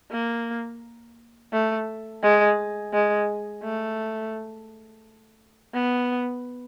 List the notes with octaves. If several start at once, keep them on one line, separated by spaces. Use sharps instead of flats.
A#3
A3
G#3
G#3
A3
B3